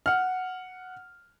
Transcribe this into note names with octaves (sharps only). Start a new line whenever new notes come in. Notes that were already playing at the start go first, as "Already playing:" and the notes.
F#5 F6